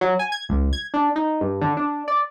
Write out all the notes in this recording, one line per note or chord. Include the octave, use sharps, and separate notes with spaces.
F#3
G#5
G#6
C#2
G#6
D4
D#4
G2
D3
D4
D5